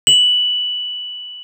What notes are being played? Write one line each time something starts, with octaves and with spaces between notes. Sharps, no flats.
F#7